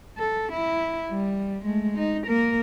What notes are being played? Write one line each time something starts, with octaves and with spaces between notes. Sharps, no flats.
A4
E4
G3
G#3 A3
D#4
A#3 A#4